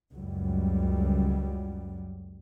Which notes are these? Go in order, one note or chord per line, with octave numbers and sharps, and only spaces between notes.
C#2 F#2 F#3 G3